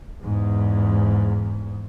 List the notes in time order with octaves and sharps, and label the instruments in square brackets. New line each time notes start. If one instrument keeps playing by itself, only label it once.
[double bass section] E2 G#2